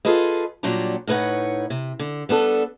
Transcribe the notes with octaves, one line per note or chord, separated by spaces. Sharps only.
F4 G#4 A4 B4 D#5
A#2 F#3 G3 D4 A#5
A2 D#4 B4 C#5 F#5
C3
D3
G3 B3 D4 A4